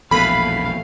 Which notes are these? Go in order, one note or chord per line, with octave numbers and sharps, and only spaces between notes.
A#1 E2 B2 A3 B4 F5 B5